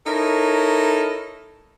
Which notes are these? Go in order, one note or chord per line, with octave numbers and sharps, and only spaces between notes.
D#4 E4 A4 A#4 C#5